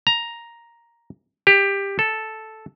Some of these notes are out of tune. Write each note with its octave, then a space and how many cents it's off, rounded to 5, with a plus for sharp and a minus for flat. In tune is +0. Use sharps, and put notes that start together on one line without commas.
A#5 +5
G4 +15
A4 -5